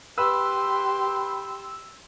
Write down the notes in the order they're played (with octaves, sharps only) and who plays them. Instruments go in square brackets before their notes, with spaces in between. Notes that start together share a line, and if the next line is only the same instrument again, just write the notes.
[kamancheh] G4 C6 [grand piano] B4 [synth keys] E6